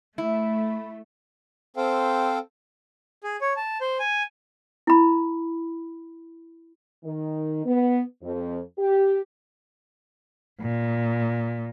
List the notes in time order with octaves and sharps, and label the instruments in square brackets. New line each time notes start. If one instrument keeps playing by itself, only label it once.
[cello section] A3 [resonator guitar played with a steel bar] E4
[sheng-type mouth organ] C4 A4 C5 F5 G5
G#4
C#5
A5
C5
G#5
[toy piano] E4 B5
[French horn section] D#3
B3
F2
G4
[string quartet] A#2